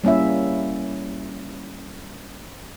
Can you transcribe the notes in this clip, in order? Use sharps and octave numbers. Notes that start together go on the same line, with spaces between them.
G3 A#3 C#4 E4 E5